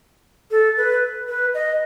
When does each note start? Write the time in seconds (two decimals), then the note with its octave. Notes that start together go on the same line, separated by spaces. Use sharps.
0.51 A4
0.77 B4
1.28 B4
1.54 D#5